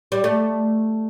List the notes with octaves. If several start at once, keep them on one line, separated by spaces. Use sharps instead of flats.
G3
A3